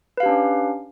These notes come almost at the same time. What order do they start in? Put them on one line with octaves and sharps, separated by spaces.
B4 F5 G4 D4 C#4